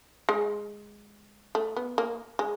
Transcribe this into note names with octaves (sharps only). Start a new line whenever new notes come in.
G#3
A3
B3
A#3
G#3